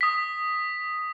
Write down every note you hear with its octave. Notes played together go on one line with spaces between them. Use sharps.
D#6 B6